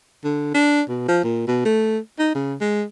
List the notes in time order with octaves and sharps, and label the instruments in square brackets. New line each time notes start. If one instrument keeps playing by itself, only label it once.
[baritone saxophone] D3
D4
B2
F3
A#2
B2
A3
D#4
C#3
G#3